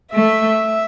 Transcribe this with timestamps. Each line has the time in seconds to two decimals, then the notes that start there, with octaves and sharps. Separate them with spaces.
0.13 A3 E5